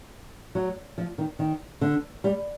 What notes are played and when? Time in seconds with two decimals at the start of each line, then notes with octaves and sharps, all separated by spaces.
0.55 F#3
0.98 F3
1.18 D#3
1.39 D#3
1.81 D3
2.24 G3